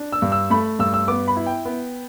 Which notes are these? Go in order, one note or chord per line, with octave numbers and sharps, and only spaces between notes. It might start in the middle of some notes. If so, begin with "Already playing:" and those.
Already playing: D4
E6
G2
E6
A3 B5
G2 E6
E6
B3 D6
B5
E4
G5
B3